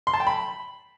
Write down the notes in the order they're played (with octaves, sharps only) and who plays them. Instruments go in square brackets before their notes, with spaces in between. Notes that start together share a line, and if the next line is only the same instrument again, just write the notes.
[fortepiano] C6
A5
G5
B5